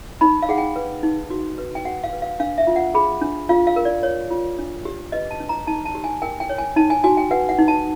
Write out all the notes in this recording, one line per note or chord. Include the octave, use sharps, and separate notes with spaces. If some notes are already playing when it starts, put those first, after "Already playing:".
D#4 B5
F5
G#4 F#5
G5
B4
D#4
F#4
B4
G5
F#4 F#5
F5
B4
F5
D4 F5
E5
F4
F#5
G#4 B5
D4
F4 F5
F5
A#4
D5
C#5
F4
D4
G4
B4 D#5
A5
D4
A#5
D#4 A5
A5
G4
G#5
A#4 G5
G5
C#5
G#5
D#4 A5
G#5
F#4 G#5
G5
B4 F#5
F#5
D#4
A5